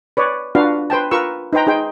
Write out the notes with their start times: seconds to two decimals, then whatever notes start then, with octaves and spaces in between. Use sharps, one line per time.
0.17 B4 C#5 D5
0.55 D4 F4 F#4 B4 F5
0.90 B4 C5 G5 A5
1.11 F4 A#4 B4 C#6 E6
1.53 D#4 B4 C5 G5 A#5
1.67 D#4 G#4 C5 G5